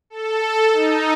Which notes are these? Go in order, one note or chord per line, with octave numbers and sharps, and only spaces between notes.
A4
D#4